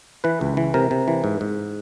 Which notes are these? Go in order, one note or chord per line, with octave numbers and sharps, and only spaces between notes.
E3 B4
C#2
E3
C3 A#4
C3
E3
G#2
G#2